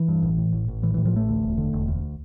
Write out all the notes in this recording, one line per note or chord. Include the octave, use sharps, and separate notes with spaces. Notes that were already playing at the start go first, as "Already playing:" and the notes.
Already playing: E3
G2
A1
A2
A1
A1
A2 E3
E3
A2
F3
A1 A3
D2
E1
D3
E1
D2